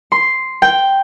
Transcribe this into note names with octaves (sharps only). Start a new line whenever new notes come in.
C6
G5